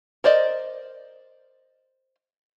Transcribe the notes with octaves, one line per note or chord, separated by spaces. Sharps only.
A#4 C5 D5 D#5